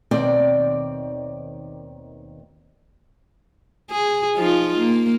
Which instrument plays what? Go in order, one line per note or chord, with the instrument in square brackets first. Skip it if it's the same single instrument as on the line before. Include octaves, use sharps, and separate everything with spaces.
[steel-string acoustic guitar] D#2 B2 D#3 C4 D5 G5
[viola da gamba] G#4
F3 D#4 F4
A#3